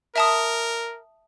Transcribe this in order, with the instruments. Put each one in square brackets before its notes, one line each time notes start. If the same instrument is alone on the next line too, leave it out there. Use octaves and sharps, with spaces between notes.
[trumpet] A#4 [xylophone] E5 A5 D#6